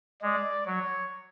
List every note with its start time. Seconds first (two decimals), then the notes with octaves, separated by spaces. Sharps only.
0.22 G#3 D5
0.66 F#3 C#5